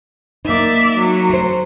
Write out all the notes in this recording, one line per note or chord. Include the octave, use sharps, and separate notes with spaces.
A#3 D#4 D5 E5
F#3
A3 C5